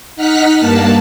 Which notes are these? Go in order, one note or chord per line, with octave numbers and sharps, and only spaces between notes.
D#4 F#5 F6 F#6 B6
G2 A#3 A5